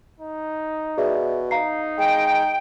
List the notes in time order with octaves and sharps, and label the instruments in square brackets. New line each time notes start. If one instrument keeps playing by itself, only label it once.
[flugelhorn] D#4
[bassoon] B2 [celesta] G#4 D5 E5
[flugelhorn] D#4 [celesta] F5 A#5 C7
[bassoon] G#3 [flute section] G5